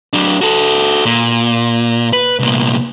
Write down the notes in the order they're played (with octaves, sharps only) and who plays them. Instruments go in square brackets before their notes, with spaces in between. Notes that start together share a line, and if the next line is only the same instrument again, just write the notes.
[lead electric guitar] F#3 D4
F#4 A4
A#2
B4
C2 A#2